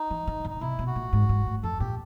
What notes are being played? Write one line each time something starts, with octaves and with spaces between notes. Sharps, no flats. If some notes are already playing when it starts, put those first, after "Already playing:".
Already playing: D#4
E3
D#3
D3
D#4
C3 E4
B2
F#4
A#2
G#2
G#2
A2
F2 A4
A#2 G4